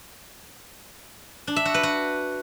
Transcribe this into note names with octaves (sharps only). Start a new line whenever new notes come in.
D4
E5
F#4
B4
F#4